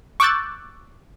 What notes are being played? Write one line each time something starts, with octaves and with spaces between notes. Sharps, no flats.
C#6 D6 E6 F#6 G6 A6